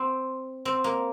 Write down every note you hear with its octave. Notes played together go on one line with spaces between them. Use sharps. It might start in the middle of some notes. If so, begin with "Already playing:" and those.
Already playing: C4
C4
A#3